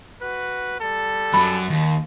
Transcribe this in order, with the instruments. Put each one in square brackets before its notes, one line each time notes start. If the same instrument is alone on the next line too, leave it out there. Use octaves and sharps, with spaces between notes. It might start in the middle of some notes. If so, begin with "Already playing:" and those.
[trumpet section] F#4 B4
G3 A4
[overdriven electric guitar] F#2 F#3 [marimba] B5
[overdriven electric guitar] D#2